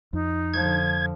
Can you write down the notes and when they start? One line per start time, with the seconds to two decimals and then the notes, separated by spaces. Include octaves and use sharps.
0.13 F2 D#4
0.54 D3 F3 G#6